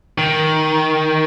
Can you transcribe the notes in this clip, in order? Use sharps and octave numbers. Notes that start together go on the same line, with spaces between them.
D#3